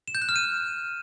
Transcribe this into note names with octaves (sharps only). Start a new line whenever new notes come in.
E7
G6
F#6
F6
D#7